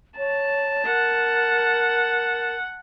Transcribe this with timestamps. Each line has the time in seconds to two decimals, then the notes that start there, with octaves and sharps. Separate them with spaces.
0.18 C#5 A5
0.86 A#4 F#5